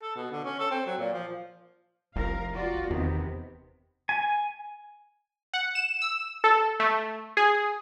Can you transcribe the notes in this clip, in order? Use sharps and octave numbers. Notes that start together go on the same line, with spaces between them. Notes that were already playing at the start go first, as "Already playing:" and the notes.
A4
B2
D3
C#4
A4
C4
F#3
A#2
F3
F1 C2 F3 A#4 F5
F4 F#4 D5
E2 C3 D#3 B3
G#5
F#5
E7
E6
A4
A3
G#4